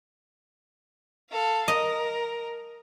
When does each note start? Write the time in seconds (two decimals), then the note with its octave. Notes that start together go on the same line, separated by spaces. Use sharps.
1.30 A4 F5
1.68 A#4 D#5